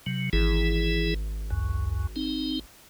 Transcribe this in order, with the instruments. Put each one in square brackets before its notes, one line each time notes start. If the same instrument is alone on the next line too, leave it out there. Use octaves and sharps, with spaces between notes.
[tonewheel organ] C3 F#3
[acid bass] G#1 [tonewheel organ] E3 E4 G#4
[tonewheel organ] C#2 F#2
C4 D#4